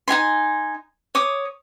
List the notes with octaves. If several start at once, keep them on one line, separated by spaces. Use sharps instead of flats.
D#4 F#4 G#5 C6
C#5 D6 D#6